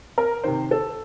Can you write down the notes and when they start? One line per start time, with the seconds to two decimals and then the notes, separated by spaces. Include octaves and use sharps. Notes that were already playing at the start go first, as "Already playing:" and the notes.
0.18 A#4
0.44 C3 D#3 C5
0.71 A4